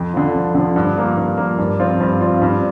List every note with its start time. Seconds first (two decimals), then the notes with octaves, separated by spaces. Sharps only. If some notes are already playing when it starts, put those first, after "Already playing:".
Already playing: F2
0.13 D3 F3
0.34 F2
0.55 D3 F3
0.76 G2
0.97 F3 A#3
1.17 G2
1.37 F3 A#3
1.58 G2
1.79 F3 C4 F4
2.00 G2
2.21 F3 C4 F4
2.42 G2